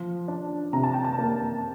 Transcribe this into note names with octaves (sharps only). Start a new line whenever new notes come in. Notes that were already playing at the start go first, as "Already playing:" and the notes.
Already playing: F3
D4
C3 A#5
A5
G5
A5
A#3